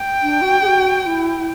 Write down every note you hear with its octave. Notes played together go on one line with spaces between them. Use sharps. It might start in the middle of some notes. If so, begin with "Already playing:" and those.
Already playing: G5
D4
F#4
G#4
F#4
F#4
E4